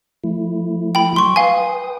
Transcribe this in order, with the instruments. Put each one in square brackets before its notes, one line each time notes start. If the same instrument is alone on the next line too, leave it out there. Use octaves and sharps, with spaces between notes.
[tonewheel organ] F3 A3 E4
[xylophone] G5 B5
[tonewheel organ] F#3 [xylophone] C6 C#6
[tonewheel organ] B4 G5 D#6 [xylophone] F5 G#5